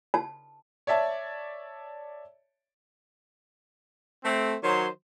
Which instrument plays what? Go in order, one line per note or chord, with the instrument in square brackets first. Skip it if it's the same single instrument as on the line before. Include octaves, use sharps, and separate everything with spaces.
[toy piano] A5
[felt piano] C#5 D5 E5 A5
[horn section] A3 C4
D#3 F#3 C5 C#5 C6